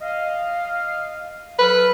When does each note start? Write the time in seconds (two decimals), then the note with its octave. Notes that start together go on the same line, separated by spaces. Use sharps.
0.01 D#5 F5
1.59 F#3 A4 B4 F6